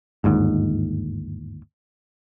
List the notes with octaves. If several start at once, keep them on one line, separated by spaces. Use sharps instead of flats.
G1 D#2 G#2